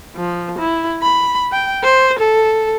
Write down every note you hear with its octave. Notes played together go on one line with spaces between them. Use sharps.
F3
E4
B5
G5
C5
A4